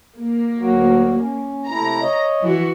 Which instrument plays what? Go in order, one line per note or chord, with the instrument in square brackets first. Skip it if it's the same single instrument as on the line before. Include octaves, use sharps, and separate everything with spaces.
[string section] A#3
[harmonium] D2 F#3 F#4
C#4
[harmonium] C3 A3 E4 [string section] A#5
[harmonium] C#5 D#5
[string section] E3 F#4